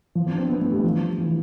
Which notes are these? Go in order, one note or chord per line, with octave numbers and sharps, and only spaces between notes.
F3
C4
D4
C4
B3
A3
G3
F3
E3